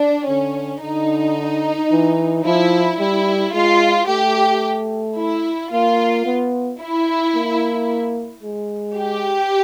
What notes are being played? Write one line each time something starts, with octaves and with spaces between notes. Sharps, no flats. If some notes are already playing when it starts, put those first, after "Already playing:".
Already playing: D4
D3 C#4
D3 D#4
E3
F3 E4
G3 E4
G#3 F4
A3 G4
E4
A#3 F4
B3
E4
A#3
G#3
G4